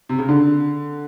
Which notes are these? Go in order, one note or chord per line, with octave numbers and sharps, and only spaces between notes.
C3
C#3
D3